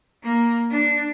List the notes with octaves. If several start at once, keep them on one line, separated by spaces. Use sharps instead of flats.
A#3
D4